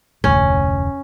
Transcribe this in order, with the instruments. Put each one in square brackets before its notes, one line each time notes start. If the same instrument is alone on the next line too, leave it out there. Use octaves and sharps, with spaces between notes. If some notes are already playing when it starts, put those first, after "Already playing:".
[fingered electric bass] F1 D2 A2 [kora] C#4